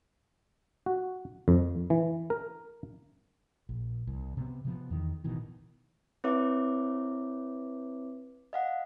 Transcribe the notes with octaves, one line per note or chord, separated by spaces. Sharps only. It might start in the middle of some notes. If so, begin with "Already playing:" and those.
F#4
F2
E3
A#4
A#1
C2
C3 B3
C3 F3 B3
E2 D#3
A1 B2 D#3 E3
C4 E4 B4 C#5 E5 D6
D#5 F5 F#5